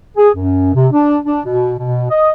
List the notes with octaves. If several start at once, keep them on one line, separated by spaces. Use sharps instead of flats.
G#4
F#2
C3
D4
D4
B2
B2
D#5